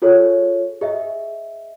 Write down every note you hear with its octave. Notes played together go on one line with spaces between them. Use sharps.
F4 G#4 A4 C#5
G#4 D#5 E5